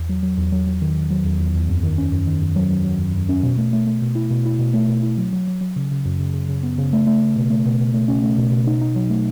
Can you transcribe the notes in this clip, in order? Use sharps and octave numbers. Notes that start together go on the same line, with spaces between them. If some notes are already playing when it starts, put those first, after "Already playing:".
Already playing: E2
F#3
F#3
E2
F#3
F#3
D#3
D#3
F#3
E2
E2
E2
F#2
D#3
C#4
F#2
D#3
F#2
F#3
F#3
F#3
F#2
F#2
C#4
B2
A3
A3
A3
B2
E4
B2
E4
B2
A3
B2
E4
F#3
F#3
F#3
F#3
C#3
C#3
F#2
C#3
C#3
C#3
B3
C#3
A3
A3
A3
B2
A3
B2
B2
A3
C#4
A3
B2
B2
D#4
D#4
F#3
A3